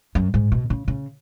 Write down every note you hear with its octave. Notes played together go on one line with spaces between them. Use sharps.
F#2
G#2
B2
C#3
C#3